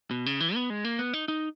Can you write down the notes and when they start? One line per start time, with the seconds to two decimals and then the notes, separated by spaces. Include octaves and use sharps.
0.11 B2
0.26 C#3
0.40 E3
0.55 B3
0.70 G#3
0.85 A#3
0.99 B3
1.13 D#4
1.28 D#4